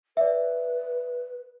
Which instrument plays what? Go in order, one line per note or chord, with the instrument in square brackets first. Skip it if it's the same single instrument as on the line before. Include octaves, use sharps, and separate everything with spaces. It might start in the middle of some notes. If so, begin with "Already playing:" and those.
[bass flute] B4 [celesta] D5 E5